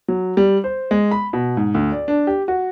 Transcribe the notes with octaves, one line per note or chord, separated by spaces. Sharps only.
F#3
G3
C5
G#3
B5
B2
G#2
D2
D5
D4
G4
F#4